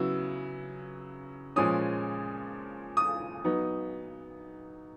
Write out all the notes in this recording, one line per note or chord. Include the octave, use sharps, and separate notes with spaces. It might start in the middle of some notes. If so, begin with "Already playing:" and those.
Already playing: C#3 F#3 B3 E4 E6
A#2 F3 G#3 C#4 D#6
D#6
F#3 B3 D#4